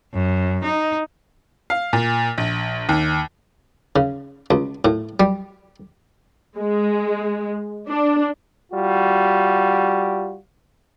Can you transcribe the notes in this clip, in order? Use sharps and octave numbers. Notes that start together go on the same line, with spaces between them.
F#2
D#4
F5
A#2
A#1
D#2
C#3
C#2
A2
G3
G#3
D4
G3 F4 F#4